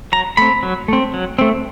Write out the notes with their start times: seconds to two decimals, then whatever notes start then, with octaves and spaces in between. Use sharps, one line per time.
0.12 F#3 A#5
0.37 A3 C4 B5
0.63 F#3
0.88 A3 C4
1.14 F#3
1.39 A3 C4